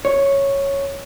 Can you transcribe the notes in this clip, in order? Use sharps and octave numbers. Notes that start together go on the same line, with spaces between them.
C#5